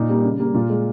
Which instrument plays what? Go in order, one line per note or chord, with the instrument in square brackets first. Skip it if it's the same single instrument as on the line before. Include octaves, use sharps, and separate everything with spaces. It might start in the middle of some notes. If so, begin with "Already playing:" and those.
Already playing: [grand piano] A#2 D#4
G3 A#3
C#3
G3 A#3
A#2 F4
G#3